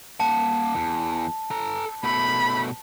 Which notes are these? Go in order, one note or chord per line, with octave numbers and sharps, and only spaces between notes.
A#3 F#5 A5
E2
A4 A#5
B2 A3 B5